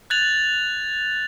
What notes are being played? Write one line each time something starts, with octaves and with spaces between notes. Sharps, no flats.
F#6 G#6 A6 F7 F#7